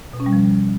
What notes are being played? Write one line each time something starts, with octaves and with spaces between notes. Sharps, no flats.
B2
C#4
G3
F3